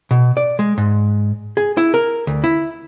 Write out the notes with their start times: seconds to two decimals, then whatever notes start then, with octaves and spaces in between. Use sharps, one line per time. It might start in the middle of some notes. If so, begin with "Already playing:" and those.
0.11 B2
0.37 D5
0.59 G#3
0.78 G#2
1.57 G#4
1.77 E4
1.94 A#4
2.27 D2
2.44 E4